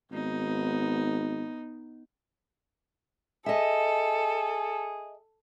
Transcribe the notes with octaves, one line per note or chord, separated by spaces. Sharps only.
G#1 B3 D#4
G#4 A4 D#5 E5